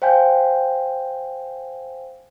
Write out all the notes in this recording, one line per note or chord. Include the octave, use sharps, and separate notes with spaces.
C5 F5 G5 G#5 G6